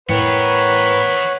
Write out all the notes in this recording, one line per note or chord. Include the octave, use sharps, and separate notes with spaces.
A2 E3 B3 A#4 B4 C#5 F#5 G5